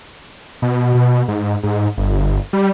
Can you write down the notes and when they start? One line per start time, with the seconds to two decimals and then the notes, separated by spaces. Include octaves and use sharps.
0.62 B2
0.95 B2
1.28 G#2
1.63 G#2
1.98 G1
2.53 G3